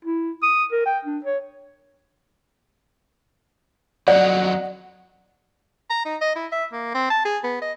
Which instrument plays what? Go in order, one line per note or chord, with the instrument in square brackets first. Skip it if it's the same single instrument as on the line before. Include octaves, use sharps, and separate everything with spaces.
[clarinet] E4
D#6
A#4
G5
D4
C#5
[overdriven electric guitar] F2 F#3 [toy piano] D5 [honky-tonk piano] D#5 F#5
[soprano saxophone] A#5
D#4
D#5
E4
E5
A#3
C4
A5
G#4
B3
D#5